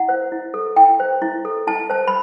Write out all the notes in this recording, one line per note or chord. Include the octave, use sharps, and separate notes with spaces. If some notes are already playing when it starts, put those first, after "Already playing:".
Already playing: E4 F#5
C5
E4
A4
E4 G5
C5
E4
A4
E4 A5
C5 A5
B5